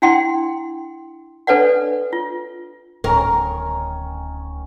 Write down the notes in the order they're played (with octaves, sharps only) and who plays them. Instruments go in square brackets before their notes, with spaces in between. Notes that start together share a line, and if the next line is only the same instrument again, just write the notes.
[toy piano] D4 E4 F#5 G5 C6
D4 A4 B4 C#5 D5 F#5
F4
[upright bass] D1 [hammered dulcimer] D#3 C#4 [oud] A#4